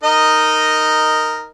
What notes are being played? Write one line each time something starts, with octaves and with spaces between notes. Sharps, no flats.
D#4 A#4 D#5